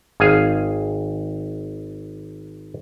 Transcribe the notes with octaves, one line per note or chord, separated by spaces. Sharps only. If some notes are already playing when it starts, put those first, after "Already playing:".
G#1 G#4 F5 G#5